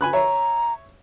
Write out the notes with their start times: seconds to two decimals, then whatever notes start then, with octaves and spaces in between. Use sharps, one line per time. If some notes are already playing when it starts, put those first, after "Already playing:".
0.01 G#5 B5 F#6
0.13 C#5 E5 A#5